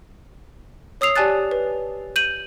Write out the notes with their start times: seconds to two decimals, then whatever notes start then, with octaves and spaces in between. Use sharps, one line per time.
1.01 C#5 D#6 E6 C7 F7
1.16 G4 D5 G#5 A5 F#6 A6
1.51 B4
2.16 G6 D#7 F#7